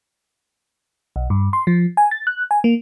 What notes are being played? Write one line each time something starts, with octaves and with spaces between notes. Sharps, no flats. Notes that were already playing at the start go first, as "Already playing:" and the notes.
B1
G2
C6
F3
G#5
A6
F#6
G#5
A#3